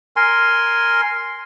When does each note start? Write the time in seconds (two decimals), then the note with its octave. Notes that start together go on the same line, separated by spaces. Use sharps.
0.16 A#4 G#5 C6